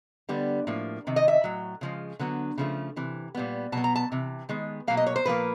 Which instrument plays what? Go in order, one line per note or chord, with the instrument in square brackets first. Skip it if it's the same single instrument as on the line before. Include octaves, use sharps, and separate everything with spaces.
[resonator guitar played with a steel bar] D3 G3 B3
A2 F3 A#3
C3 D#3
D#5
E5
A2 F#3
C#3 F3 G#3
D3 F#3 B3
C#3 F3 A3
C3 E3
A#2 G3 B3
B2 F#3 B3 A5
A#5
A5
C3 E3
D#3 G#3 B3
B2 F#3 A#3 F5
D#5
C#5
C5
A#2 F3 A#3 B4